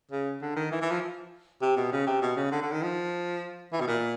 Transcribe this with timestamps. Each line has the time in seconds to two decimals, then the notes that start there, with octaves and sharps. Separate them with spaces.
0.11 C#3
0.41 D3
0.56 D#3
0.71 E3
0.81 E3
0.91 F3
1.62 C3
1.77 B2
1.92 C#3
2.07 C3
2.22 B2
2.37 C#3
2.52 D3
2.62 D3
2.72 D#3
2.82 F3
3.73 E3
3.81 B2
3.87 A#2